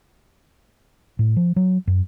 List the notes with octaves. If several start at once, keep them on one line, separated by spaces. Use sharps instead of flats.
A2
F3
F#3
F#2